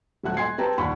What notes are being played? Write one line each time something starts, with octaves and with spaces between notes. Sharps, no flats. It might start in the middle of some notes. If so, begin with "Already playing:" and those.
D#1 F#3 A3 F#5 F#6
D#5 G#5 C6 G#6 C7
C4 G4 B4 G5 A5 A#5
A#1 D#2 G3 F#5 B5 C#6